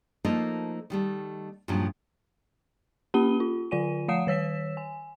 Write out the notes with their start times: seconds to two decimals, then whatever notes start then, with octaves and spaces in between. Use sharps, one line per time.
0.25 F3 A3 A#3 D#4 F4 A4
0.90 D#3 G3 A3
1.68 G2 A#2 C#3 F3 F#3
3.14 A#3 C#4 G4 B5 D#7 G7
3.40 F4
3.71 D3 F4 D5 G#5 D#7
4.08 F3 F5 F#5 D#6 C7 E7
4.27 D#3 C#5 E6 B6 E7
4.77 G#5